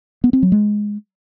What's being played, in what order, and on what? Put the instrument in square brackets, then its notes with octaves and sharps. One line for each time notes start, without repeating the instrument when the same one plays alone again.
[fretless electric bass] B3
C4
F#3
G#3